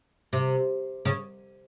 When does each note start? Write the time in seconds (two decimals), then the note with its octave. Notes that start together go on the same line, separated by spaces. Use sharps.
0.33 C3
1.05 C#3